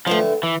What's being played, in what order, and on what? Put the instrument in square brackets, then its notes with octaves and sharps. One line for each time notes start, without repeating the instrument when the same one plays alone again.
[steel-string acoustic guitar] G2 D3 A3 [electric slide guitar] F3
[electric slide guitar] E3